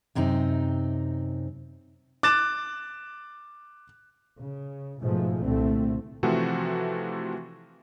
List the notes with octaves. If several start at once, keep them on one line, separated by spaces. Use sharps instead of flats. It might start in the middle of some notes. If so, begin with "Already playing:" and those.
F#2 C3 C4 D#4
D6 F#6 A6 E7
C#3
G#2 B2 F3 G#3 A3
C2 A#2 D3 A3 C4
C3 E3 F3 A3 C4 F#4